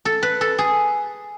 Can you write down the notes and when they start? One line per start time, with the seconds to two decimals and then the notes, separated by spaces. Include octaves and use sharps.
0.05 A4
0.23 B4
0.41 A4
0.58 G#4